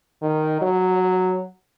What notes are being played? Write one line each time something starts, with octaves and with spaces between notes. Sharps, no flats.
D#3
F#3